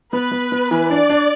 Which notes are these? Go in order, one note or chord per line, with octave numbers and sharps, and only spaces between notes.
B3 B4
B3
B3
E3
D4 D5
D4